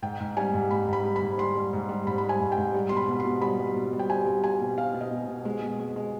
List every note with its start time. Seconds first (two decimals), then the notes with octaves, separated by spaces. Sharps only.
0.02 G#2 G5
0.20 G#2
0.37 G3 G#5
0.54 G#2
0.71 G#2 B5
0.88 G#2
0.93 B5
1.05 G3
1.16 B5
1.22 G#2
1.38 G3 C6
1.56 G3
1.73 G#2
1.89 G3
2.07 G#2 B5
2.18 B5
2.24 G3
2.29 G#5
2.41 G#2
2.52 G5
2.58 G#2
2.74 G3
2.89 B2 C6
2.97 B5
3.08 B2
3.20 C6
3.25 B2
3.42 G3 B5
3.59 G3
3.77 B2
3.93 G3
3.99 G5
4.10 G3 G#5
4.26 G3
4.44 G3 G#5
4.61 B2
4.78 B2 F5
4.94 B2
5.01 D#5
5.11 B2
5.29 B2
5.45 G#3
5.62 B2
5.80 G#3
5.96 G#3